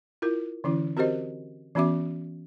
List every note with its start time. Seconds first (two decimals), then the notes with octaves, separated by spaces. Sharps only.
0.22 E4 F4 A#4
0.64 D3 E3 C#4 E4
0.97 C4 F#4 G4 A#4 C5 D#5
1.75 E3 B3 C#4 F#4 E5 D6